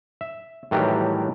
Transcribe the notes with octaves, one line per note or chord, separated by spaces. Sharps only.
E5
A2 D#3 E3 F#3 G3 G4